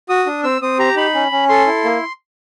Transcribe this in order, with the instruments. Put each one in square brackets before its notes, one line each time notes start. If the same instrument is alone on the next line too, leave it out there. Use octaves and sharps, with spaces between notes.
[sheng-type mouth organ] F#4 D#6
D4
C4 E6
C4 D#6
G4 A#5
D#4 B5
C#4
C#4
A4 C6
E4
A#3